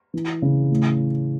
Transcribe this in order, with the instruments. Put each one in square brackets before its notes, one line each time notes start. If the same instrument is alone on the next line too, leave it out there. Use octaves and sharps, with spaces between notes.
[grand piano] E3
C#3
A2